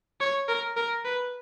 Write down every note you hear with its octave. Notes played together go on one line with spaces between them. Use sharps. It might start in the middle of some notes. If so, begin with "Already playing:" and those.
C#5
A#4
A#4
B4